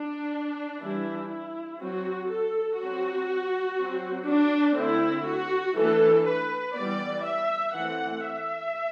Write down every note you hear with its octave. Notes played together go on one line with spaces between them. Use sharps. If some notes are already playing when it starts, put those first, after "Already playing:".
Already playing: D4
E3 G3 D4 E4
E4
F#3 C4 F#4
A4
F#3 C4 F#4
F#3 C4
D4
D3 A3 C4 E4
F#4
E3 A3 D4 A4
B4
E3 G3 B3 D5
E5
E3 A3 C4 F#5
E5